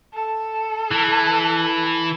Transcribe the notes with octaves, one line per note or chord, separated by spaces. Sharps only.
A4
E3